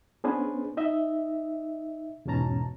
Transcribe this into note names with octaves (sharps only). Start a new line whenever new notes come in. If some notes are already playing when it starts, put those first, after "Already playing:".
B3 C#4 D4 G#4 B4 C5
D#4 D#5 E5
E2 G#2 B2 C#4 A5 A#5